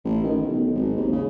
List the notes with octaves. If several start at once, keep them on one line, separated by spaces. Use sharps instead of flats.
A1
D#3
B1
G#1
D#2
C#3